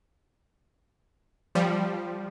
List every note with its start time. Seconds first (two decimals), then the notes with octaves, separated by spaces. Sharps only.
1.55 F3 G3